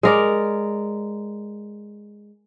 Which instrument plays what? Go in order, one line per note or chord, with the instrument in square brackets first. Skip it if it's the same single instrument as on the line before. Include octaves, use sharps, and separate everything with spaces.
[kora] G#3 A#4 D5